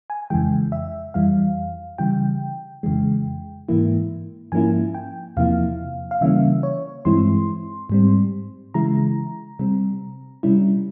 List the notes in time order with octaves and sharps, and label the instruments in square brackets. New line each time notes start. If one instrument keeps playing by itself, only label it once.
[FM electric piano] G#5
F2 C#3 E3 G#3 G5
E5
F2 E3 G3 F5
C#3 E3 G3 G5
F2 C#3 E3 G#3
G#2 E3 A#3 E4
G#2 F3 A#3 C#4 E4 G#5
G5
E2 C3 F3 A#3 E4 F5
F5
C#3 E3 G3 A#3 C#4 E5
C#5
G2 E3 G#3 C4 E4 C6
G#2 G3 C4
C#3 E3 G#3 E4 A#5
C3 G3 C4
C3 G3 C#4 E4